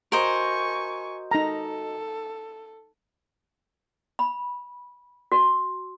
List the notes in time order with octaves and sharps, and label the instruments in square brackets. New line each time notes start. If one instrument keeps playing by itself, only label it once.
[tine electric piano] F#4 D#5 [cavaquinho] A#4 C5 [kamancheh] G#5 C#6
[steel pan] D#4 A#5 [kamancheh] A4
[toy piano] B5
F#4